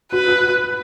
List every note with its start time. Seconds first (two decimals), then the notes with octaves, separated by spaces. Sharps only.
0.12 F#4 B4
0.28 F#4